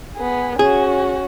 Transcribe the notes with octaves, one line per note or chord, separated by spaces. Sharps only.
B3 G#4
C#4 F#4 G#4